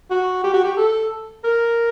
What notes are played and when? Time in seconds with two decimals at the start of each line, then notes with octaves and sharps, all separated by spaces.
0.10 F#4
0.43 G4
0.53 F#4
0.64 G4
0.77 A4
1.44 A#4